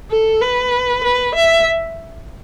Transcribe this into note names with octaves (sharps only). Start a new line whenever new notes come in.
A4
B4
B4
E5